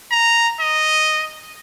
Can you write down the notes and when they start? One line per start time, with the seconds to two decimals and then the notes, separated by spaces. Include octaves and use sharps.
0.11 A#5
0.60 D#5